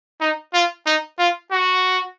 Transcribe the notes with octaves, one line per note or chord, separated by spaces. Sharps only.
D#4
F4
D#4
F4
F#4